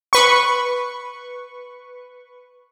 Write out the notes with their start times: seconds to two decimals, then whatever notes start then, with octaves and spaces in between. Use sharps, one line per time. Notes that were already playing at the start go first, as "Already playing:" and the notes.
0.13 B4 C#6